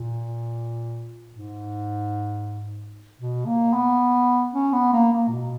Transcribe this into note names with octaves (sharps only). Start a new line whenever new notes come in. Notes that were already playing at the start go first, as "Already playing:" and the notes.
Already playing: A#2
G#2
B2
A#3
B3
C#4
B3
A#3
A#3
A#2
B2